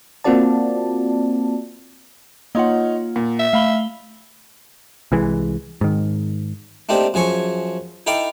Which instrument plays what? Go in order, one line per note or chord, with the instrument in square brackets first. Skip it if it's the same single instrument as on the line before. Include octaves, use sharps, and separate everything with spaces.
[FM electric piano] A#3 C4 F4 F#4 D5 A5
[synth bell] A#3 F4 F#5 [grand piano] D#4 C#5
[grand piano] A#2
[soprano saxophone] E5
[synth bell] A3 B5 G7 [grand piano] F5
[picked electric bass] C2 E3 G#3
G#2 D#3
[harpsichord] A3 A#3 C4 D4 D#4 G4
F#2 F3 G#4 G#5 C#6
D#4 E4 A4 F5 G5 D6